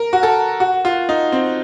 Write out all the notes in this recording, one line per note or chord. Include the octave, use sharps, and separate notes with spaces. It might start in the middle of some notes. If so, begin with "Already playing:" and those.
Already playing: A#4
F#4
A4
F#4
F4
D#4
C4